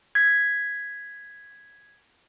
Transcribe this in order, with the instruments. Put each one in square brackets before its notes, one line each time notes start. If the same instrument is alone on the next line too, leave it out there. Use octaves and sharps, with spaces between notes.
[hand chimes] G#6 B6